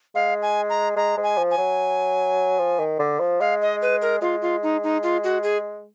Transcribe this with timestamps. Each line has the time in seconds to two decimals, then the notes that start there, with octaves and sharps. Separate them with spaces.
0.15 G#3 F5
0.42 G#5
0.69 A#5
0.96 G#3 A#5
1.17 G#3
1.23 G#5
1.38 F3
1.51 G#5
1.58 F#3
2.59 F3
2.79 D#3
2.99 D3
3.20 F3
3.40 G#3 F5
3.61 D#5
3.82 B4
4.02 A#4
4.21 G#3 F4
4.42 F4
4.63 D#4
4.83 D#4
5.03 F4
5.24 F#4
5.43 G#4